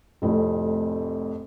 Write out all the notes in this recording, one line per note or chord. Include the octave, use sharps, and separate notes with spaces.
F1 F2 A2